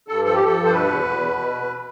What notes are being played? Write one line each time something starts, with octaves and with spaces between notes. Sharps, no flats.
G2 A4
F3 A4
G4
F3 A4
G2
C5
B2 B4
E2
E2
B2
B2